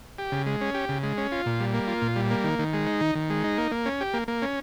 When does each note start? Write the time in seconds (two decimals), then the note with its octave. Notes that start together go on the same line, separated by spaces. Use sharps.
0.19 G4
0.32 C#3
0.46 G#3
0.61 C#4
0.74 G4
0.89 C#3
1.03 G#3
1.18 C#4
1.32 F4
1.46 A#2
1.60 G3
1.74 A#3
1.88 F4
2.02 A#2
2.16 G3
2.31 A#3
2.44 D#3
2.59 D#3
2.74 G#3
2.87 D#4
3.01 D#3
3.15 D#3
3.30 G#3
3.44 D#4
3.58 A#3
3.72 A#3
3.85 C#4
4.01 G4
4.14 A#3
4.28 A#3
4.42 C#4